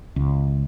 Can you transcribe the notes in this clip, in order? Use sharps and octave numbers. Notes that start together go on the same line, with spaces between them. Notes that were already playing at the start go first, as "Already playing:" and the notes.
C#2